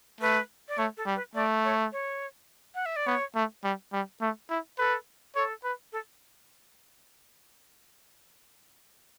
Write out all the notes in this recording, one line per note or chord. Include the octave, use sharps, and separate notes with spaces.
A3 B4
D5
A3 C#5
A4
G3
B4
A3 D5
C#5
C#5
F#5
E5
D5
B3 C#5
A3
G3
G3
A3
E4
A4 B4
A4 C#5
B4
A4